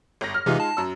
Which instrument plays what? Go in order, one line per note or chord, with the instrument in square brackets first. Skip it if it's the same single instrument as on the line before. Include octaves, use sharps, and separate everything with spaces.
[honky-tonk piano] G1 A#6
F6
[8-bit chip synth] C3 E3 [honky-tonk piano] G#3 D#4 F4
[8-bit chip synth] A5
[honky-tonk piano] F#2 E6